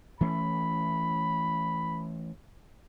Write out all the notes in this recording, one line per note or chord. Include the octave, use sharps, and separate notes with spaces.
E3 A3 C#4 B5